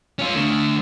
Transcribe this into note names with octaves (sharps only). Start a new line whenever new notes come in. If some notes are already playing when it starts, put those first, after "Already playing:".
C#4 F4
D3 A3